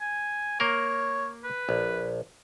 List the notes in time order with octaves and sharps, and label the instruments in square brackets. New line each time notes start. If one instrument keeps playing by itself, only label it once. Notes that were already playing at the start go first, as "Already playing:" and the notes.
[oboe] G#5
[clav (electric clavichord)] A#3 A#4 [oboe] C#5
[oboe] B4
[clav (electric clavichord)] A#1